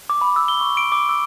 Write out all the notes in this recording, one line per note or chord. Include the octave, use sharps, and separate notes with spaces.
D6
B5
E6
G7
C#6
D7
D6
E6